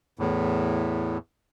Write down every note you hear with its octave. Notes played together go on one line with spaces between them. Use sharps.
E2 A2